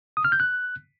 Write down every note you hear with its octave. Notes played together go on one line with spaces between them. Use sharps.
D#6
F6
G6
F#6